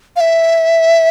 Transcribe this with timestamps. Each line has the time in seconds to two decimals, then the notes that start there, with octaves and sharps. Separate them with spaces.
0.16 F5
0.20 E5